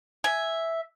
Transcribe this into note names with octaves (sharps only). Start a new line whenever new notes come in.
E5 G#5